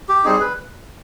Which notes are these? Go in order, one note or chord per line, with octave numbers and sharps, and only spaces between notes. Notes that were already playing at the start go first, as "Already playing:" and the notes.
G4
G3 C4 D#4 G#4
B4